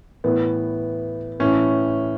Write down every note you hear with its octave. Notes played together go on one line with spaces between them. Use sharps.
A2 E3 B3
A2 E3 C#4